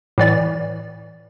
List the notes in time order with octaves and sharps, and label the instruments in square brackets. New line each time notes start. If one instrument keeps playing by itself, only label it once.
[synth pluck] A2 E3 D5 A6